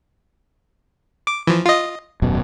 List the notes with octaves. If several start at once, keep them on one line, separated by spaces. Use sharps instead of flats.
D6
E3 F3
F4 D#5
D#1 F#2 B2